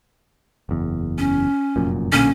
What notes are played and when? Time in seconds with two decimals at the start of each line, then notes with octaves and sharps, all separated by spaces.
0.69 F#1 E2
1.18 C#4
1.76 F1 F#2 A#2
2.12 B1 A#2 D3 C#4